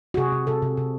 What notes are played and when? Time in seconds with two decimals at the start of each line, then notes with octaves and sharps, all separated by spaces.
0.14 F#4
0.17 C3 G#4
0.32 C3
0.47 C3 A4
0.62 C3
0.77 C3